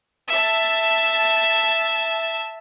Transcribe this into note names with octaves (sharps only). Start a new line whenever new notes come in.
E5 A5